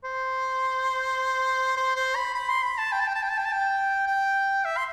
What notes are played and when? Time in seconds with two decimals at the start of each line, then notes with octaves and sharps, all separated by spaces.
0.04 C5
1.77 C5
1.96 C5
2.16 B5
2.35 B5
2.49 C6
2.63 B5
2.78 A5
2.92 G5
3.00 A5
3.07 G5
3.15 A5
3.22 G5
3.30 A5
3.38 G5
3.45 A5
3.52 G5
4.07 G5
4.65 E5
4.77 C6